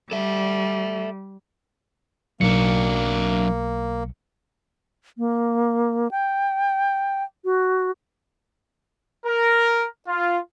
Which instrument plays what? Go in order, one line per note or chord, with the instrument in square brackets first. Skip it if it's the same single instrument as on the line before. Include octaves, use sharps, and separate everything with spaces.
[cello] G3 [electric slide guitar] A4 D5 E5
[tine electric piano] B1 C#7 [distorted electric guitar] F#3 D4 [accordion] A#3
[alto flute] A#3
G5
F#4
[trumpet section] A#4
F4